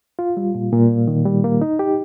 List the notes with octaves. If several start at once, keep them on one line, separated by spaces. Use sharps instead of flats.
F4
G3
A#2
A#2
D#3
G3
A#3
D#4
G4